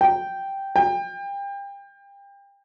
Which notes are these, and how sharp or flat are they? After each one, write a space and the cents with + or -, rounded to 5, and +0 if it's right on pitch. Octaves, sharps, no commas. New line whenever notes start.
G5 -5
G5 +30